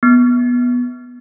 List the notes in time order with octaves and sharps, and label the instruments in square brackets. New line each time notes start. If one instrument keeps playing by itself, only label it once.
[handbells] B3